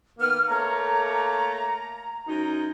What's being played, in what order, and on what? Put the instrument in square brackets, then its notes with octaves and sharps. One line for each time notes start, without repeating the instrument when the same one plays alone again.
[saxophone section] D#3 A#3 B3 [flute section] F6
[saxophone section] A3 A#3 C#5 [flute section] A#5
[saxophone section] F#2 D#4